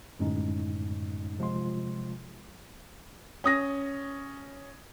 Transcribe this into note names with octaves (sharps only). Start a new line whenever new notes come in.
F#2 A2 D3 G#3 C#4 D#4
C3 F3 G#3 F4 C6
C#4 D#6 A#6